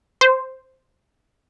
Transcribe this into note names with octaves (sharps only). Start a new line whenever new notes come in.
C5